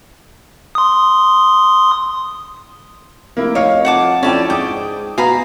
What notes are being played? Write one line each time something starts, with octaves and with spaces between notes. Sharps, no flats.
C6 D#6
F1 A#3 E4
D#4 C#5 F5
F2 F#5 A5 D6
F2 C#4 E4 D5 G5 A5
G#2 G5 D6 D#6
B2 F5 G#5 A#5 B5